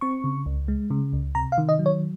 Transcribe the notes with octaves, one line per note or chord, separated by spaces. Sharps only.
C4 C#6
C#3
C#2
G#3
C#3
C#2
C3 A#5
F5
D#3
D#5
F#3
C#5